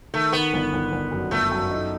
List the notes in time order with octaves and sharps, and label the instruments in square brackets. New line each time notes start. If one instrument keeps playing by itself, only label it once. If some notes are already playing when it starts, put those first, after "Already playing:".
[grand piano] D#3 [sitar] A3
[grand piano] D#3 [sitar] B3
[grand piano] G1
G1
G1
F#2
[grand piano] G1 [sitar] A3
[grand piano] F#2
D#4